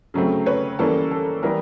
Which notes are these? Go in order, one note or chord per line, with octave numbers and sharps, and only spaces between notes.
C#3 F#3 A3 C4
B4 C#5
E3 G3 A#3 C#4 A4 B4
A4
E3 G3 B3 A#4